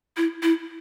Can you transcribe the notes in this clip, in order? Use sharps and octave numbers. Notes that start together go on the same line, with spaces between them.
E4
E4